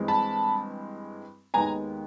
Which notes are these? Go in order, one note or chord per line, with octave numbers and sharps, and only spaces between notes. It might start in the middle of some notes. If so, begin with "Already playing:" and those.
Already playing: G2 E3 G#3 C4
A5 B5
D#2 D#3 G#3 B3 G#5 A#5